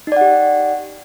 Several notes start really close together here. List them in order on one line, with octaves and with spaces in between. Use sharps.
D#4 D5 F#5 G4